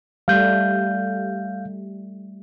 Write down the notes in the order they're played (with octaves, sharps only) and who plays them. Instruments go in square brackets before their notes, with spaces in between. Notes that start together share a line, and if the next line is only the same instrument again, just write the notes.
[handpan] G3 A3 [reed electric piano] F5 G6